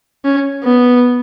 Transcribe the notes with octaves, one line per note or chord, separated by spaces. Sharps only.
C#4
B3